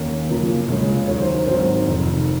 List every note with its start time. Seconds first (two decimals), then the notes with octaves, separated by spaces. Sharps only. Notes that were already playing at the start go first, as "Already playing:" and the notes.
Already playing: D#2 D#3 A#3 C#4
0.29 F#2 C#3 F3 A#3
0.68 C#2 C#3 G#3 C#4
1.07 D#2 D#3 F#3 C#5
1.20 C5
1.34 A#4
1.47 G#1 G#2 F#3 C5
1.86 F1 F2 C3 D#3